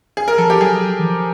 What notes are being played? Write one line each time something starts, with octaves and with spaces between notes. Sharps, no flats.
G#4
A#4
F3 A4
G4
F#3 G#4
E3
F3